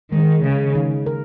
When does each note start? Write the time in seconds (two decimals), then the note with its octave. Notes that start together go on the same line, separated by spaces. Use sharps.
0.12 D#3 G#3
0.44 C#3 G#3
0.75 D#3
1.06 A#4